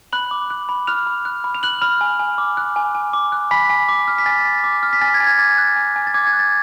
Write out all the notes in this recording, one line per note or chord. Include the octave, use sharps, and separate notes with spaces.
B5 F#6 F#7
D6
F#6
B5
F6 F#6 F7
B5
F#6
B5
F7
F#6 F#7
B5 F6 F7
G#5
G#5
D6
F#6
G#5
G#5
D6
F#6
G#5 B5 B6
G#5
D6
F6
B6
G#5 A6
G#5
D6
F6
B6
G#5 A6
G#6
G#5
G#6
D6 A6
F#6
G#5
G#5
A6
D6 G#6
G#6
F#6
A6